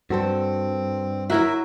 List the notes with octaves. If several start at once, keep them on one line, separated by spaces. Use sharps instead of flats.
G2 C4 F#4 A4 C5
F#3 E4 F#4 A#4 E5